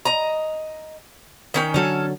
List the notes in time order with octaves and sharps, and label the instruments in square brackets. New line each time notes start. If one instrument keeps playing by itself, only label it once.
[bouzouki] D#5 A#5
D#3 C#4 G5
[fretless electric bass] D3 F#3 [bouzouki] C#4 A4